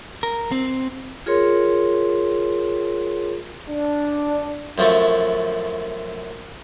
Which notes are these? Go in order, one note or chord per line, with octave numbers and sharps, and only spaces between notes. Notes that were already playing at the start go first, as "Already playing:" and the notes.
A#4
C4
F4 G#4 A#4 C#5 C6
D4
F#2 F3 A3 C#6